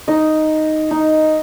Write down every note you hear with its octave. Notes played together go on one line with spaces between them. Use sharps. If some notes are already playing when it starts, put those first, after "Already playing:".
D#4 D#5
D#4 D#5